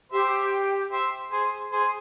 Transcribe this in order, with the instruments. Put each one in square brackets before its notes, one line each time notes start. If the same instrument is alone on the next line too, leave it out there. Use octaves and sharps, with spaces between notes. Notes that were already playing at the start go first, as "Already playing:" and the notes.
[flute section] G4 [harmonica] C5 E5
[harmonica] C5 E5
G#4 C5
G#4 C5